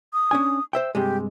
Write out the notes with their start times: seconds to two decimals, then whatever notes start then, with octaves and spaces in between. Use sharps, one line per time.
0.13 D#6
0.31 C#4 D4 G#5
0.73 C5 E5 G5
0.95 G2 C3 G#3 G4